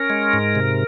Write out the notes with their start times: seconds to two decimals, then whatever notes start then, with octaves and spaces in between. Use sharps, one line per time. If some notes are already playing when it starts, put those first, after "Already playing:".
Already playing: C#4 A#4
0.10 G#3
0.33 G#2
0.55 C3